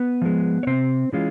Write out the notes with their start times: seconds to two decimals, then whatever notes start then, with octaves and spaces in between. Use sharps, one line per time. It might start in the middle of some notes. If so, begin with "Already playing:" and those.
Already playing: B3 B4
0.22 F3 G#3
0.63 C#5
0.67 C3 C4 C5
1.13 E3 G#3 C#4 F4